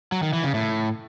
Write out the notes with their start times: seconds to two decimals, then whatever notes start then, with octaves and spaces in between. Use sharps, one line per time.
0.12 F#3
0.23 D#3
0.33 E3
0.44 C#3
0.54 A2